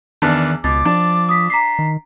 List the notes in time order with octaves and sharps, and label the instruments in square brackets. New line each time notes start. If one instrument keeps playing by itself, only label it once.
[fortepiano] E2 B3 D4 [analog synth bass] D#3 [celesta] A5 F6 F#6
[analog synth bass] C#2 [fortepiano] B2 [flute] D6 [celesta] A6
[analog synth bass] F3 [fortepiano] D4
[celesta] D#6 B6
A#5 B6 C7
[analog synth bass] D#3